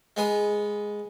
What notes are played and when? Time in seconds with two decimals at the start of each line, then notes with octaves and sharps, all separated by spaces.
0.16 G#3 B3 G#4